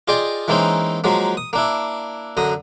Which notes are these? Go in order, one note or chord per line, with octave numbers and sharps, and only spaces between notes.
F4 G#4 D5 D#5 G5
E3 G#3 A#3 C4 C#4 D#4
F3 F#3 G#3 A#3
D#6
A#3 D4 E4
F#2 D3 A#5 D#6